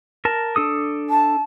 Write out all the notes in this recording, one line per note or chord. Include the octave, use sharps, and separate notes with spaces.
A#4 A5
D4 A4 D#6
A5